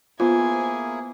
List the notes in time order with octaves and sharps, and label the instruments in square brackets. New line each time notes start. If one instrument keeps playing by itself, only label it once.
[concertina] A#3 E4 G#4 [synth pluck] B3 C5 [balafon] F4 [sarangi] G#5